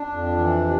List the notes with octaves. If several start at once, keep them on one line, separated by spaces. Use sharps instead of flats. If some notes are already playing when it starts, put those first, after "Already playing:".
Already playing: D4
F2
E3
C3